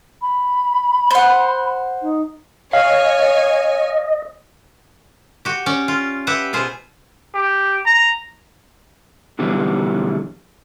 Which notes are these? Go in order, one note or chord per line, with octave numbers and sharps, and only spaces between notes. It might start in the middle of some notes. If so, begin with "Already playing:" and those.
B5
C5 F#5
D#4
C#5 D#5 F5 G#5
F#4 G4
C#4 D5
F4
G4 B4 E5 F#5
B2 F4 G#4 C5
G4
A#5
B2 D3 E3 F#3 G3 B3